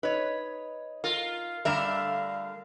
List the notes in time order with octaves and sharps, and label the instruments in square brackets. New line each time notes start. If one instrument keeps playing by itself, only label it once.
[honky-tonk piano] D#4 [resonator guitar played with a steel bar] B4 C#5
[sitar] F4 [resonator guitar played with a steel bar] A#4
[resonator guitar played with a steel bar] D3 G3 A3 [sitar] A#4 [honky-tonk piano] E5 E7 [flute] F5